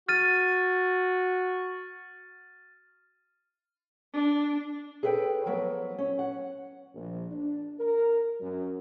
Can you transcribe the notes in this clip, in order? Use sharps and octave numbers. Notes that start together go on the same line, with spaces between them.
F#4 F6 A6 D#7
D4
G#4 A4 B4 F#5 G5
F3 F#3 B3
C#4
F#5
A#1
D4
A#4
F#2